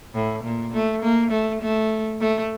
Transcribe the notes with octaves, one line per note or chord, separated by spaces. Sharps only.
A2
A#2
A3
A#3
A3
A3
A3